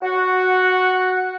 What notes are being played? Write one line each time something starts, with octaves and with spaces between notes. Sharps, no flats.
F#4 F#5